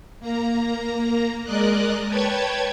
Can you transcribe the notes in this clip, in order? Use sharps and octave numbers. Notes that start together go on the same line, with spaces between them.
A#3 A#5
G#3 A#4 D5 D#5 F#6
B4 C#5 G5 A5 G#6